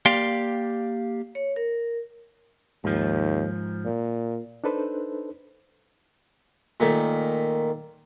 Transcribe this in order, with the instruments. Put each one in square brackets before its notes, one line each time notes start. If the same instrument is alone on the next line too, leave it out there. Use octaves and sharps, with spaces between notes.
[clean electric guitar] A#3 G4 D5 F5 G5 C6
[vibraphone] C#5
A#4
[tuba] D#2 [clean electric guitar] G#2 F3
[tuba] A#2
[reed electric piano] D4 D#4 A4 B4 C5
[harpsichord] A#2 D#3 A3